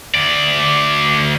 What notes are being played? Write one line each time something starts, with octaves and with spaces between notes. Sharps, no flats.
D2 D5